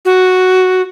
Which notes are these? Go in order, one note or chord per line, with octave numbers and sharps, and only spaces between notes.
F#4